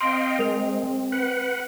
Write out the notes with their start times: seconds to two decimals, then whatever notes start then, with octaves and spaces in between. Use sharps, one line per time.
0.01 C4 D#5 F5 G5 C6 D7
0.39 G#3 A#4 F7
1.12 B4 F#5